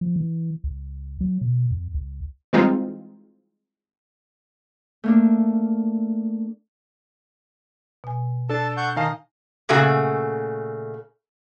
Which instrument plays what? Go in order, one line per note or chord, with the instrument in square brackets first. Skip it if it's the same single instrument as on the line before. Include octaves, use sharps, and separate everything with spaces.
[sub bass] F3
E3
C#2
F#3
B2
F2
C#2
[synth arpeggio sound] E3 G3 G#3 C4 D#4 F4
[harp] A3 A#3 D4
[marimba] B2 G#5
[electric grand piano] D4 A4 [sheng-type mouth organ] A5
[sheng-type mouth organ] F#5 C#6 G6
[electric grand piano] D#3 F5 A5 [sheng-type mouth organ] D#4 D#5 [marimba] G#5
[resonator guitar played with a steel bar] A#2 C#3 A3 F#4